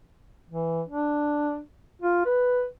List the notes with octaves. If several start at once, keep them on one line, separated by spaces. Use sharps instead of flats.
E3
D4
F4
B4